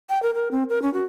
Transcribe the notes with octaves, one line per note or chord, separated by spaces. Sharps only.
G5
A#4
A#4
C4
A#4
C#4
F#4